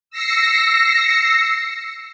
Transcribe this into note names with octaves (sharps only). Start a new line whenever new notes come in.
E6 A#6 C7 C#7